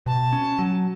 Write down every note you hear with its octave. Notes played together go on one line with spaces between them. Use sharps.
B2 A5
C#4
F#3